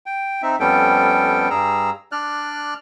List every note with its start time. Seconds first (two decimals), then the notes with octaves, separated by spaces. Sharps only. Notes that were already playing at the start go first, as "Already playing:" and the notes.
0.06 G5
0.43 C4 D#4 E5
0.60 F2 G3 B3 C#4 A4 G5
1.50 G2 G3 G#4 A#5 E6
2.12 D4 D5 F6 F#6